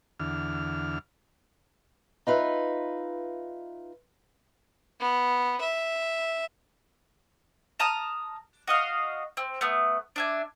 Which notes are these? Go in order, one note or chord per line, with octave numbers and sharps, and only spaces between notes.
E2 D3 F6
D#4 F4 B4 E5
B3
E5
A5 A#5 D#6 F6
F#4 D#5 F5
C4
A3 B3
D4 E5 G#5